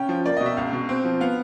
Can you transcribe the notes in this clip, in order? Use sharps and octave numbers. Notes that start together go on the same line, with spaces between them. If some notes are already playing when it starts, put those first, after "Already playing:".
Already playing: C#3 C#4 G5
F3
A#3 D5
B2 D#5
E5
C#2 F5
B2
C4
F3
B3 F5